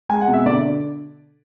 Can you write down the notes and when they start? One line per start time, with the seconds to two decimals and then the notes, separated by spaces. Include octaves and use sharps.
0.09 G#3 G#5
0.21 F#5
0.28 B2
0.33 E5
0.46 D3 D5